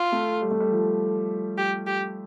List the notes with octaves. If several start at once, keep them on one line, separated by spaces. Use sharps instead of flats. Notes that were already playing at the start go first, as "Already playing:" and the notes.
Already playing: F4
A3
G3
A3
G3
F3
G4
G4